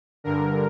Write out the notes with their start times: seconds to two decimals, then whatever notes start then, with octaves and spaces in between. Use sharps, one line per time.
0.24 G2 D3 A#4